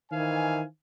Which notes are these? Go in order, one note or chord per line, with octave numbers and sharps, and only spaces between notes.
D#3 E3 C5 F5 G#5